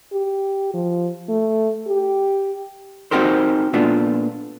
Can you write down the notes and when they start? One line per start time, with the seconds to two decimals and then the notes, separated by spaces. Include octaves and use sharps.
0.12 G4
0.74 F3
1.29 A3
1.87 G4
3.11 C4 D#4 F#4 G4 A#4 C5
3.73 A#2 A3 B3 D4 F4